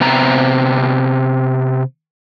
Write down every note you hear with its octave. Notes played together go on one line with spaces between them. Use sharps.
C3 B3 C4 A#5